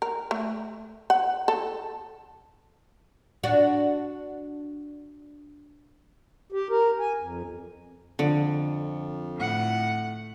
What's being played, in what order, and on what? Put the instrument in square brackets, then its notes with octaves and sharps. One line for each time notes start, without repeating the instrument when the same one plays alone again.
[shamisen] A#4
A3
F#5
A4
[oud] D4 F#4
[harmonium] G4
A#4
G#5
F2
[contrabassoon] F2 [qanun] D3
[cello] A2 F#5